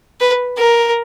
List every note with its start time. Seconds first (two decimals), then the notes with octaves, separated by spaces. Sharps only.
0.20 B4
0.58 A#4